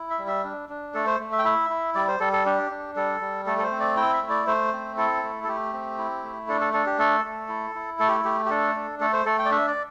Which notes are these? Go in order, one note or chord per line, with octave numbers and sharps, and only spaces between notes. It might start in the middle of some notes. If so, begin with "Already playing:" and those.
Already playing: E4
E5
G3
E5
D4
D4
A3 A4
C5
A3
E5
G5
E4 E5
E4
G3 D5
C5
G3 A4
A4
D4 G4
D4
G3 A4
G3
A3 A4
A4
C5
C4
D5
E4 G5
E5
A3
D5
A3 C5
C4
E4 A4
A3
A4
A3 G4
C4
E4
A3
D4 A4
A4
D4 A4
G4
A3 A4
A3
E4
E4
A3 A4
G4
A3 G4
G4
D4 A4
D4
A3 A4
C5
A3 A4
G5
D5
D4 E5
D5